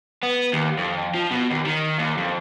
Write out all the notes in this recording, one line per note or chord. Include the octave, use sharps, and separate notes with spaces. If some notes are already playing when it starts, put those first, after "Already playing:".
B3
D#2
F2
F3
B2
D#2
D#3
D#2
F2